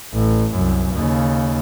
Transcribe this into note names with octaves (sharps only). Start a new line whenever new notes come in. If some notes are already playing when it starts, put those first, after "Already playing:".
A1
C2 F#2
D#2 C#3